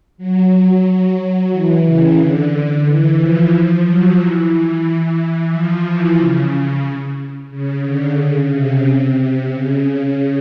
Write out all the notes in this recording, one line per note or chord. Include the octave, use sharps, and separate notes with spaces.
F#3
F#3
F#3
E3
C#3
D3
D3
E3
F3
F#3
E3
F3
E3
C#3
C#3
D3
C#3
C3
C#3